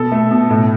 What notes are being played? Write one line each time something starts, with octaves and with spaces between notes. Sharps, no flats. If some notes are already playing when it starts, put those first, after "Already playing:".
Already playing: B2 B3 A4
A3
B2
A2